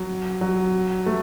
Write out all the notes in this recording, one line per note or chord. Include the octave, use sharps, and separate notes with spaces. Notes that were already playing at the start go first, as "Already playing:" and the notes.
Already playing: F#3
F#3
A3